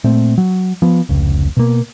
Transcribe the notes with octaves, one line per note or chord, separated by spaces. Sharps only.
A#2 A3 C4
F#3
F3 B3
F1 C#2
B2 A#3